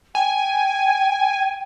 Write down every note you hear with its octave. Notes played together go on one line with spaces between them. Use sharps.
G5 G#5